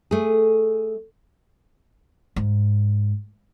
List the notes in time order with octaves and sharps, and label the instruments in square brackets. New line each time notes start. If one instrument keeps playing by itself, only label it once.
[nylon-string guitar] A3 G#4
[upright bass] G#2